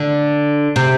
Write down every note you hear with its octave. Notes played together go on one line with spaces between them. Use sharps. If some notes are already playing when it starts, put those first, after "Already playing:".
Already playing: D3
C3